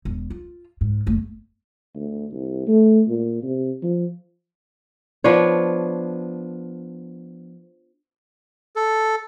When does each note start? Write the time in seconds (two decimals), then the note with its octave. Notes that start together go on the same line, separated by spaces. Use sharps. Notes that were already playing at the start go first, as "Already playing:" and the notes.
0.05 E1
0.30 F4
0.81 G#2
1.06 F#1 A3
1.95 D2
2.33 C2
2.67 A3
3.08 A#2
3.43 C3
3.83 F3
5.24 F3 B3 D4 C#5
8.76 A4